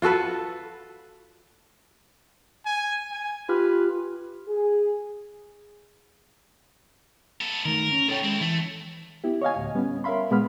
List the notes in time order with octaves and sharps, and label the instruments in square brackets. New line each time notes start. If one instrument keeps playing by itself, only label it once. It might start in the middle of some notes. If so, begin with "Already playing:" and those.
[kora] F4 F#4 A4 B4
[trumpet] G#5
G#5
[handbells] F4 G4 F6 [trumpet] B4
[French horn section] G#4
[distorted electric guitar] B3 A4
[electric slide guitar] D#3 A3 [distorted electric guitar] A#4
[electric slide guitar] C#4
[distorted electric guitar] B2 G3 [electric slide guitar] A4 C#5 G5
[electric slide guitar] G#3 [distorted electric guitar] C4 E4
[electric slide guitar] E3 [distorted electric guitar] A3
[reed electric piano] B3 E4 G4
C#5 D#5 F5 G#5
D2 A2
G3 B3 C#4
A#4 C#5 E5 F5 B5 C6
A#2 G#3 B3 B5 F6